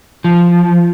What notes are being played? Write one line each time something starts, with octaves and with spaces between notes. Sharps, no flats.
F3